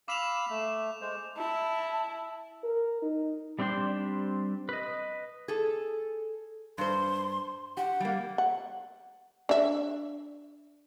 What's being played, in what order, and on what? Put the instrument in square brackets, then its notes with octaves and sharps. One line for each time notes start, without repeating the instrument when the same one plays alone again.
[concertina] F5 B5 E6 [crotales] D6 E7 F7
[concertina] A3
G#3 C5
[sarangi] E4 [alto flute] A5
[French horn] A#4
D#4
[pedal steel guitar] G3 C4 D4 G5 C6
B4 D#5
[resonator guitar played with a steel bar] G#4 A4
[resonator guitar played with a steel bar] G2 C5 [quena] C6
[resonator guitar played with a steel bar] G4 [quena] F#5
[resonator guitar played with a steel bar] G3 A#3
[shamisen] F#5
D4 E5